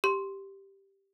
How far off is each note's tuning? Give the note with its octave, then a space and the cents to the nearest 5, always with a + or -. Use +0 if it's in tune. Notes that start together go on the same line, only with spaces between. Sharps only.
G4 +0 C6 +0